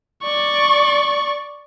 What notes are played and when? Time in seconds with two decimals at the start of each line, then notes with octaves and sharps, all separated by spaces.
0.23 D5 C#6